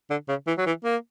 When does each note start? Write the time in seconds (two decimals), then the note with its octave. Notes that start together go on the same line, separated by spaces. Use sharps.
0.10 D3
0.28 C#3
0.47 E3
0.58 F#3
0.66 E3
0.84 A#3